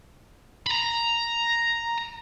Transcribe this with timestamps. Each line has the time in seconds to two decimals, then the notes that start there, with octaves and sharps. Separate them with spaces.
0.66 A#5 B5